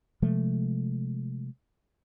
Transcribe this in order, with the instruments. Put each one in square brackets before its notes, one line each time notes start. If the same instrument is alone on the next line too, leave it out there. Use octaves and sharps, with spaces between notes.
[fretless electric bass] C3 F3 G#3 A3